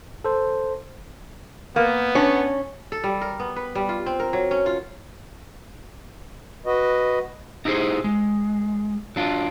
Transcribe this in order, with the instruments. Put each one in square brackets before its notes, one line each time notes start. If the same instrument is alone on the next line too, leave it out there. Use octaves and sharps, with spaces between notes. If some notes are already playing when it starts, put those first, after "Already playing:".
[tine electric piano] A4 C5
[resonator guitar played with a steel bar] A#3 [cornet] B3
[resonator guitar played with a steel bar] C#4 [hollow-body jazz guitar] D4 C#5
[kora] A4
G3
A#4
B3
B4
G3
F4
C4
A#4
F#3
C#4
F4
[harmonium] F#4 B4 D#5
[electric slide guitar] D#4 E4 G4 G#4 C5
G#3
F#3 D4 F4